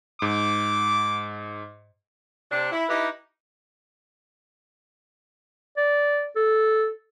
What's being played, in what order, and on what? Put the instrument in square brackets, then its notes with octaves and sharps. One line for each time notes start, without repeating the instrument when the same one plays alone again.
[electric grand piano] G#2 [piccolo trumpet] D6
[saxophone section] C3 D4
E4
D#4 E4 G4 B4 D#5
[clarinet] D5
A4